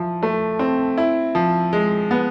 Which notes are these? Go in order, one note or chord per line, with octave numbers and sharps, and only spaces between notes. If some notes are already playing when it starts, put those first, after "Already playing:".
Already playing: F3 E4
A3
C4
E4
F3
G#3
B3